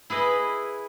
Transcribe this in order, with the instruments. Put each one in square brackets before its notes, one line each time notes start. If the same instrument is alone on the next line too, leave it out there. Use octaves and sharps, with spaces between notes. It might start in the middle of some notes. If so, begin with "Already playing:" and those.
[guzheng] E4 G#4 B4 D#5